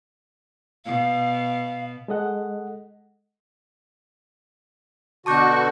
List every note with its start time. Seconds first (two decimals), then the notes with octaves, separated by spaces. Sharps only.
0.85 B2 F5
2.08 G#3 A4 D#5 F#5
5.26 B2 D3 F#4 A5 C#6 D6 G6